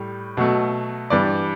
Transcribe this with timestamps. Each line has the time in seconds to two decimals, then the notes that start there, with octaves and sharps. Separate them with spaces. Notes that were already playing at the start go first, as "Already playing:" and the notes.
Already playing: A2 G3
0.37 B2 F#3 A3
1.10 G2 E3 G3 D5